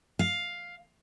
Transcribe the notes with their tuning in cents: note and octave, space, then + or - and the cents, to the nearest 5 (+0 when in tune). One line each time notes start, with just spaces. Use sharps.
F5 +5